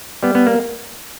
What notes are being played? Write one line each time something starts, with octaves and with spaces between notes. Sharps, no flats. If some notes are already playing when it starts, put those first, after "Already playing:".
G3 B3
B3
A#3